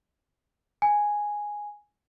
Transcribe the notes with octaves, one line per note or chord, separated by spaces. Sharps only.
G#5